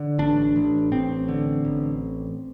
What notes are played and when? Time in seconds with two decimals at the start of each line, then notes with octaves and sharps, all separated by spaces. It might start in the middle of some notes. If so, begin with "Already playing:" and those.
Already playing: D3
0.19 A1 D4
0.56 A1
0.92 A1 C4
1.28 D3
1.65 A1